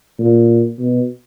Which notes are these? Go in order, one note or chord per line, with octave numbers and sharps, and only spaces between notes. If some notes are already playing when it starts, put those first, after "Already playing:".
A#2
B2